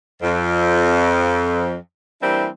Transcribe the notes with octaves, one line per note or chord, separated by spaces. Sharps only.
F2
E3 G3 A#3 C4 D4 E4